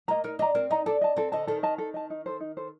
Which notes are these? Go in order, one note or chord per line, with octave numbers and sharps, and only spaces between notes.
A#3 D#5 A#5
D#4 A#4
D4 D#5 A#5
C4 A#4
D#4 D#5 A#5
D4 A4
D#5 A5
C4 A4
D3 D#5 A5
D#3 A4
D#5 A5
A4
D#5 A5
D#4
A4 C5
D#4
A4 C5